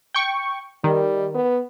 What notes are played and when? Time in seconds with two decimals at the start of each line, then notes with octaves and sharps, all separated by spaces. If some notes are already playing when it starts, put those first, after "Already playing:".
0.14 G5 C#6
0.84 D#3 G3
1.35 B3